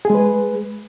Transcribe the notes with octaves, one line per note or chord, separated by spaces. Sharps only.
G#3 G#4 B4